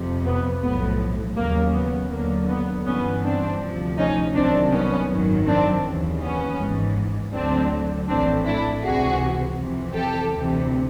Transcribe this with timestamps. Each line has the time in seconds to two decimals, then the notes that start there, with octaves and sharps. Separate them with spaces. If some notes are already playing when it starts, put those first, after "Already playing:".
Already playing: F2 C3 F3
0.25 B3
0.61 B1 A2 F3 B3
1.37 D#2 C#3 F#3 A#3
1.74 B3
2.11 D#2 D3 F#3 A#3
2.48 B3
2.86 G1 G2 E3 B3 C#4
3.23 C4 D4
3.60 D2 C3 F3
3.97 C#4 D#4
4.35 C2 C3 D#3 F#3 C4 D4
4.72 B3 C#4
5.10 G#1 F#2 D#3 F#3
5.46 C4 D4
5.84 D#2 C#3 E3
6.21 B3 C#4
6.58 G#1 G#2 E3
7.33 D2 D3 F#3 C4 D4
8.07 A#1 A2 E3 C4 D4
8.45 D4 E4
8.82 C#2 C3 E3 F#4 G#4
9.57 F2 C3 E3
9.93 G4 A4
10.31 D2 C3 E3